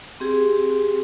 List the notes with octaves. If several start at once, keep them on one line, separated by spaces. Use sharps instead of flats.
C4 G4 G#4